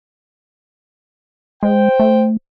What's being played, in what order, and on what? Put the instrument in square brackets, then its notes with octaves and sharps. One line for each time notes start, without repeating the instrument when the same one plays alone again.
[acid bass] G#3 [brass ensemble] C5 G5
[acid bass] A3